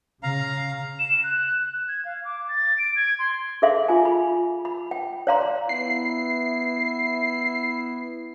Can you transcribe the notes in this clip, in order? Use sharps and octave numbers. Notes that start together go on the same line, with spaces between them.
C#3 F5 A#5
E7
F#6
F#6
G#6
F5
D6
A6
D7
G#6
C6
G#4 A4 E5 F5 C6
F4 G#5
B5
B5
G5
C#5 D5 F5 A#5 C6
B3 E4 C7